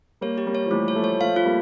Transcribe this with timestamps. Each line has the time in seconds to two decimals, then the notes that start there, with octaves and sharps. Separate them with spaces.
0.21 G3 A#3 C#5
0.38 G4
0.46 G3 A#3
0.55 C#5
0.66 F3
0.71 E3 G3 A3
0.88 C#5
0.95 F3 A3
1.04 C#5
1.20 F3 A3 F5
1.36 F4
1.45 G3 A#3